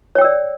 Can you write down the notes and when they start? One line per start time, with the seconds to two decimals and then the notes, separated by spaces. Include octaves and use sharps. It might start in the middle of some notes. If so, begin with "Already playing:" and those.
0.15 C#5
0.18 G5
0.21 E6
0.24 D5